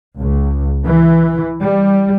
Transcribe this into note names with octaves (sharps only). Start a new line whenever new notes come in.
C#2
E3
G3